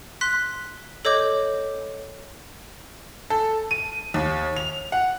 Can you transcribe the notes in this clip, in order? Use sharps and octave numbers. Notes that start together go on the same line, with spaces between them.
C6 F#6 B6
A4 C#5 D#5 D6 G6
A4
D#7
D#2
F7
F#5